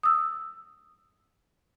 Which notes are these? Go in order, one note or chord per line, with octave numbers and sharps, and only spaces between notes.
D#6 E6